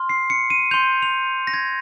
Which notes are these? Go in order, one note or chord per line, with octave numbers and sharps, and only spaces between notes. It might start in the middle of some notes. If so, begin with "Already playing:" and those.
Already playing: C6 F6
C7
C#7
D#7
C6 G6 F7
F7
A#6
G#6